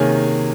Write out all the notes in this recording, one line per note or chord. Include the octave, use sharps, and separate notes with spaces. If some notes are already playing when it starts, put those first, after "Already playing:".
Already playing: C3 D#3 A#3 C#4 G#4 G#5